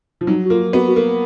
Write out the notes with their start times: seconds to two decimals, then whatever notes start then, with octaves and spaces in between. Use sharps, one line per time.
0.21 F3
0.27 F#3 D#4
0.45 F#4
0.50 A#3 F4
0.73 B3 F#4
0.88 F#4
0.96 A#3